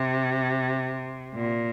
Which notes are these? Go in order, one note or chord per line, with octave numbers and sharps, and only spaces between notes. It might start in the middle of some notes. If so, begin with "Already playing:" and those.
Already playing: C3
A#2